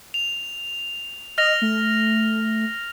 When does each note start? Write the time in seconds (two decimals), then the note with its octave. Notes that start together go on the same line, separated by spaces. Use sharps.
0.14 F7
1.38 D#5 F6 A#6 F7
1.62 A3